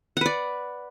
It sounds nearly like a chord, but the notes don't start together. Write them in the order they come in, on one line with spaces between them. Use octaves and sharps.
F#5 B4 D5